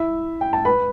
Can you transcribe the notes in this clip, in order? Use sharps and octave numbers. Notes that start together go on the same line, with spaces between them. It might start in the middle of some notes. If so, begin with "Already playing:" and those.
Already playing: E4 E5
G5
A5
B4 B5